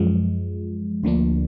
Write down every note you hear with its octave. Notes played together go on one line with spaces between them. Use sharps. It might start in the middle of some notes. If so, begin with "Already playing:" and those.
Already playing: F#2 F3 G#3
D2 D3 F3 A#3 D4